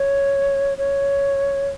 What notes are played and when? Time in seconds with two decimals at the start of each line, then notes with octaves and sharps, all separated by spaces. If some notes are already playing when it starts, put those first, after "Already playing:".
Already playing: C#5
0.78 C#5